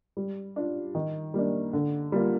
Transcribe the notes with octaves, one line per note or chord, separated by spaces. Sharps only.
G3
D4 F4
D#3
G3 A#3 D4
D3
G3 A#3 F4